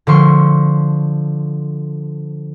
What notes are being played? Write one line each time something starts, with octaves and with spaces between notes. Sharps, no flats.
D3 F3 C6 C#6